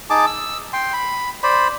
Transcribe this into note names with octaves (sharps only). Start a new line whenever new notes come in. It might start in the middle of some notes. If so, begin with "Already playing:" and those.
D#4 G#4 A5 D6
E6
G5 C6
B5
C5 D5 B5